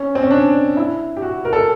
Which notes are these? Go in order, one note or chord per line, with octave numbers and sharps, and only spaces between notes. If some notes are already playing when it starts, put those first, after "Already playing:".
Already playing: C#4
C4
C#4
D4
E4
G4
F#4
A#4
A4